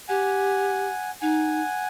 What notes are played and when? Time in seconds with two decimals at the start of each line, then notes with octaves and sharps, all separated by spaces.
0.09 G4 F#5 G#5
1.21 D#4 F#5 G#5